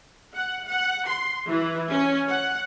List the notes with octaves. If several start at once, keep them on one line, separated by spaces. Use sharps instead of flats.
F#5
F#5
C6
E3
C#4
F#5